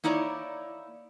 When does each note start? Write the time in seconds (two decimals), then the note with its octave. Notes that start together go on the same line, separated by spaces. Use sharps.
0.04 A#3 D#4 E4 C#5 D5